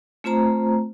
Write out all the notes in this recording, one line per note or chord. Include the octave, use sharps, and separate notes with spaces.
A3 C4 F4 C5 A#5